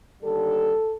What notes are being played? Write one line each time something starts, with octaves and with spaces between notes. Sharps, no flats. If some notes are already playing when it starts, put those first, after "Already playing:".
D#2 D3 G3 A4